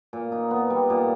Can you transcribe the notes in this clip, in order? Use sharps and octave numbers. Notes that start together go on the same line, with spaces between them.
A#2
D#4
B3
G3
A#2